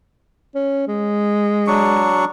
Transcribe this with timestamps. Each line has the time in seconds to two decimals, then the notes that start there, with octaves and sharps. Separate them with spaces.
0.55 C#4
0.87 G#3
1.67 F#3 D4 C#6